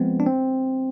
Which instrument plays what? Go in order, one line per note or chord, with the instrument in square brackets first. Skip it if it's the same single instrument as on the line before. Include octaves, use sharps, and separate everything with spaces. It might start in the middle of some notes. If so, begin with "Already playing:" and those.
Already playing: [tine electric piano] F3 G#3 B3 C4
D4
C4